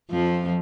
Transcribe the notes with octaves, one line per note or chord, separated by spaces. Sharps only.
F2 F3